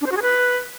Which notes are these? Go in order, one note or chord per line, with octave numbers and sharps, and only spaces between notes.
D4
C5
F#4
G#4
B4